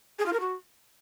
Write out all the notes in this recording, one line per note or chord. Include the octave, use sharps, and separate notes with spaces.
G#4
F4
A#4
F#4